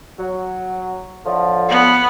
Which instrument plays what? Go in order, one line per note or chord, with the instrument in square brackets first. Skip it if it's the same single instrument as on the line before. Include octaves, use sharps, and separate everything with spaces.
[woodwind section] F#3
A2 D3 F3
[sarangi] B3